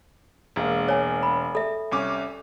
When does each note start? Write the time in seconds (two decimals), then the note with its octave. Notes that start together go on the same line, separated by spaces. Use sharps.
0.56 E1 G#3 A#3
0.88 C#5 G#5
1.23 B5
1.55 A4 E5
1.92 C2 C#4 D6